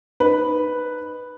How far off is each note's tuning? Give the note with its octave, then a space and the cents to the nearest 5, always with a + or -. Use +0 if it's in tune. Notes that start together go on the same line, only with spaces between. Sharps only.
D#4 -20 B4 +0